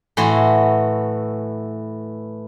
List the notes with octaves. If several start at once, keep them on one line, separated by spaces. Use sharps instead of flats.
A2 E3 F#4 A5 C6